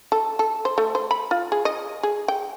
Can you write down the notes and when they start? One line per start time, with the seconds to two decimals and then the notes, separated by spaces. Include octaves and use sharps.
0.12 A4
0.39 A4
0.65 C5
0.78 A3
0.95 C5
1.11 B5
1.31 F4
1.52 G#4
1.65 D#5
2.03 G#4
2.28 G5